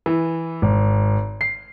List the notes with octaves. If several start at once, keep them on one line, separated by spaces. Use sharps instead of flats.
E3
G#1
C7